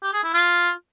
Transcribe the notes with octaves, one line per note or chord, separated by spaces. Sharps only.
G4
G#4
E4
F4